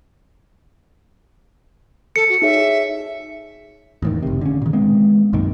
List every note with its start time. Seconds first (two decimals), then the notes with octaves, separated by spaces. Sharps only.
2.16 A4 C#7
2.29 F#4
2.42 D#4 G#4 C#5 E5
4.02 E2 A2 D#3
4.22 F#1 C3
4.41 D3 C#4
4.62 A#2 D#3
4.73 G#3 B3 C4
5.33 B1 F#2 A#2 D#3